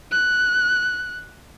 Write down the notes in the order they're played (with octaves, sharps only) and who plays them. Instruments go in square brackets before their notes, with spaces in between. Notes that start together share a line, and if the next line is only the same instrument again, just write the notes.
[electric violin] F#6